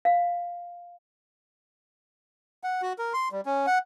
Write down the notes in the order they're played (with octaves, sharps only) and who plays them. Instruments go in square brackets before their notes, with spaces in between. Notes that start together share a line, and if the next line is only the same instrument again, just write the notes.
[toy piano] F5
[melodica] F#5
F#4
A#4
C6
G3
C#4
F#5